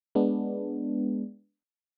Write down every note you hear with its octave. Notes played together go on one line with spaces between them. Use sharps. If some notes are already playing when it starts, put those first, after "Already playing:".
G#3 B3 D4